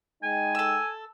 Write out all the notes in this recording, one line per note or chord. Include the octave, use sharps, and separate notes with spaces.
G#3 D#4 G5 G#5
A4 E6